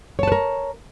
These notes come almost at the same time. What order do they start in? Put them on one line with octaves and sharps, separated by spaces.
C#5 A5 B4 A#4